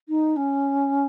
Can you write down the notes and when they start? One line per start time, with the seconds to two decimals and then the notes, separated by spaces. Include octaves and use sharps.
0.08 D#4
0.36 C#4